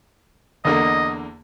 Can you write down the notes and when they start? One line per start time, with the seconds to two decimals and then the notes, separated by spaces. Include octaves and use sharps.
0.65 E2 D3 A#3 D#5